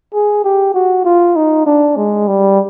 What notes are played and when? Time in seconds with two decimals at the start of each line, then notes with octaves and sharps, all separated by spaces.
0.14 G#4
0.44 G4
0.74 F#4
1.05 F4
1.36 D#4
1.66 D4
1.96 G#3
2.27 G3